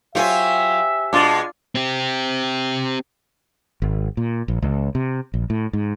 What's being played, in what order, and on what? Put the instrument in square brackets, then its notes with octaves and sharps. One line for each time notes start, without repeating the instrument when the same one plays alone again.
[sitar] F#3 F4 [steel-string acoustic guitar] G4 C5 G#5 [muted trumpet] E5
[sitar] B2 G#3 [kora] D4 F4 D5
[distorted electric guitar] C4 G4
[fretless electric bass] G#1
A#2
A#1
C#2
C3
A#1
A2
G#2